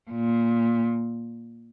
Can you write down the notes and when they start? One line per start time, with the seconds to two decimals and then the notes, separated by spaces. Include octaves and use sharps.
0.11 A#2